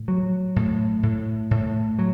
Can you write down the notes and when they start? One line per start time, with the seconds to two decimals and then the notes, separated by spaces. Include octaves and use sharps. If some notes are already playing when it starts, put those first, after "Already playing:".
Already playing: A2
0.08 F#3
0.56 A2
1.03 A2
1.51 A2
1.99 F#3